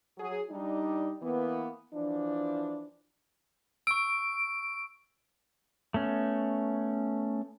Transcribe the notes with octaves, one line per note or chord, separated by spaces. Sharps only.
F#3 G#4
G3 D4 D#4
E3 A#3 B3
E3 F3 D4
C#6 E6 D7
A3 B3 C#4